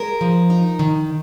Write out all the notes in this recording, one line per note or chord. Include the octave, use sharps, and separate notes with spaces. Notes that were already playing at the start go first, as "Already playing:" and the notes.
Already playing: G#3 A#4
F3
D#4
D#3